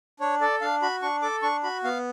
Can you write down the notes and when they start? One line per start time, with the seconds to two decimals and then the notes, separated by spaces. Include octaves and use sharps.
0.20 D4 C#5
0.41 A4 D5
0.61 D4 F5
0.82 F#4 B5
1.02 D4 C#6
1.22 A4 D6
1.42 D4 C#6
1.63 F#4 B5
1.84 B3 F5